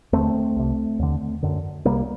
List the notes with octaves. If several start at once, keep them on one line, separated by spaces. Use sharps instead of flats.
D#2 D3 A3 C4
C2 C3
D#2 D3
F#2 D3
C2 C3 G3 A#3